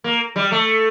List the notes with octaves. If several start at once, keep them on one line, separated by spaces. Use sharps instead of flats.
A#3
G3
A3